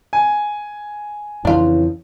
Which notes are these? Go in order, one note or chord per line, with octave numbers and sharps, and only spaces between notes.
G#5
F2 C#3 E3 D4 F4